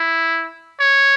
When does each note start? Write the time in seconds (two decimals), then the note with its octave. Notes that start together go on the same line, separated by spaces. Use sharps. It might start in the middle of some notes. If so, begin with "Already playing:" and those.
Already playing: E4
0.80 C#5